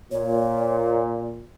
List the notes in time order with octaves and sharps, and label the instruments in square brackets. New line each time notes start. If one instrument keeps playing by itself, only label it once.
[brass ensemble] A#2 [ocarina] C#5